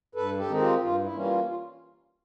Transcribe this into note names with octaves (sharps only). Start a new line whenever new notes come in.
G2 A4 B4
G4 A4
D#3 G#3 C4 D#4
F4 G4
G2 F4
E4
E3 G3 A#3 C#4
F4
F4